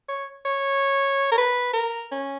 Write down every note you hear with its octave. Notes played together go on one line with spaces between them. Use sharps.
C#5
C#5
A#4
B4
A#4
C#4